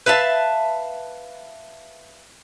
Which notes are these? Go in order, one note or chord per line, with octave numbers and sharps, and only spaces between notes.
B4 E5 F5 A5